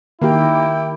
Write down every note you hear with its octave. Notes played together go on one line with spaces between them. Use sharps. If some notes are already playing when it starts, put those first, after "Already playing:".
D#3 A#3 E4 G4 G5